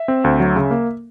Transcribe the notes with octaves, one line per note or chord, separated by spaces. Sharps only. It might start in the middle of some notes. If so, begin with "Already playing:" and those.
Already playing: E5
C4
D2
F#3
C#3
A#3